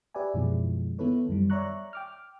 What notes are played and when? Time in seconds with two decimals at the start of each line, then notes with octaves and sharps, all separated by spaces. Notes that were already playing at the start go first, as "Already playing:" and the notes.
0.14 G4 B4 D5 E5 G#5
0.34 F#2 B2 D#3 F3 G#3 E4
0.99 D#3 B3 E4 A4 B4 C#5
1.29 F#2 D#3 G3
1.50 C#5 D5 E5 A#5 C#6 F#6
1.93 G5 D6 F6